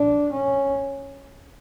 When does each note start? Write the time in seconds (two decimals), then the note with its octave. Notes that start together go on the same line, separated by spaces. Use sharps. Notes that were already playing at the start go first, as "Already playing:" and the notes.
Already playing: D4
0.32 C#4